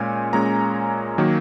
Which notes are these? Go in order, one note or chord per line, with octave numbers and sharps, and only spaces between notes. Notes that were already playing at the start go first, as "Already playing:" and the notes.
Already playing: A#2 G#3 C#4 G#5
A#2 G#3 C#4 A#5
D#3 F#3 A#3